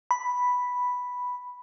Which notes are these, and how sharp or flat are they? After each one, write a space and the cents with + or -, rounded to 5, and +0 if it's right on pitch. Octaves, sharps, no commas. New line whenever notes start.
B5 +0